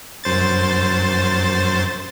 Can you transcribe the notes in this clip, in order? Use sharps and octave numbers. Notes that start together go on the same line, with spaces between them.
F#2 C5 A6